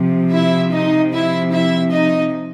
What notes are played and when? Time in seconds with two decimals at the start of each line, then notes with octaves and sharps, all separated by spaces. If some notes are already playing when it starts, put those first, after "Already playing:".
Already playing: C3 F3
0.32 E4 E5
0.72 D#4 D#5
1.12 E4 E5
1.52 E4 E5
1.92 D#4 D#5